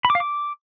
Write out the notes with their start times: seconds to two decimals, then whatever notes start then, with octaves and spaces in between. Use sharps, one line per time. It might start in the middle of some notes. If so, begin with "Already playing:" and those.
0.05 B5
0.10 D6
0.15 F5
0.20 D6